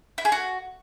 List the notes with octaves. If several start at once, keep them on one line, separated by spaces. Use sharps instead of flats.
E4
G#4
F#4